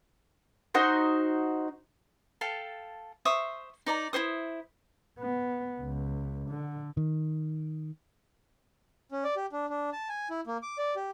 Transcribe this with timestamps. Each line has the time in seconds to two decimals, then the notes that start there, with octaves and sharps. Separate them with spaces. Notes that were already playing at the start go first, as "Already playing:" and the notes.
0.74 D#4 F#4 C5
2.41 A4 F5 G5 A5
3.25 C5 E5 C#6 D#6
3.86 D#4 D5 A#5
4.13 E4 F#4 C5 D#6
5.19 B3
5.81 C#2
6.50 D3
6.97 D#3
9.12 C#4
9.24 D5
9.36 G4
9.52 D4
9.70 D4
9.93 A5
10.09 G#5
10.30 E4
10.47 A#3
10.63 D6
10.78 D5
10.96 G4